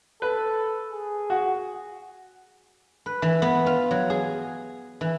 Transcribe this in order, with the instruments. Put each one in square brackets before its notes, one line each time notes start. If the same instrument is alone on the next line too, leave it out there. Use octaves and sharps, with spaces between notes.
[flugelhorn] A4 [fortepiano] B4
[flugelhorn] G#4
[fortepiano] F#4
[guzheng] B4
E3
B3
F4
F#3
G#4
E3